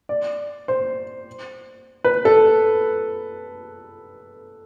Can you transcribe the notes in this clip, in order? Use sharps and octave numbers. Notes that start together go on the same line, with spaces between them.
D5
C5
B4
A4